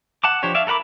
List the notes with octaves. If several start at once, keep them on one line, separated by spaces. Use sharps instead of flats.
F#5 A5 D6
F3 D4 G4 C#5
D5 E5 F5
A4 A#4 F#5 B5 D6